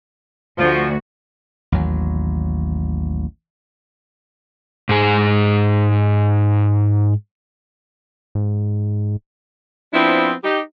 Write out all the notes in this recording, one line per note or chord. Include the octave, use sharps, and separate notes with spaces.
D2 F3 F#4
A1 D#2 F#3
G#2 G#4
G#2
F3 B3 C4 D4 E4
D#4 G4